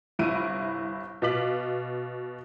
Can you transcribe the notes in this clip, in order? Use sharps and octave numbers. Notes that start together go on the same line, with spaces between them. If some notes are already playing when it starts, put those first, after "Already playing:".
G1 C2 E4 D7 D#7
B2 D#5 F5 D6 B6 F#7